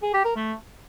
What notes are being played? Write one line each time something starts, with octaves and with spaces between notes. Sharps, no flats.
G#4
G4
A#4
A3